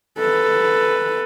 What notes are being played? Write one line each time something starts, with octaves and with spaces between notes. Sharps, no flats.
A4 B4